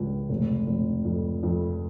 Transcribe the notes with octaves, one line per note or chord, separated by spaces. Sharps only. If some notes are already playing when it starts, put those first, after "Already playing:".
Already playing: C#2 G3
F1
F1
F2
F2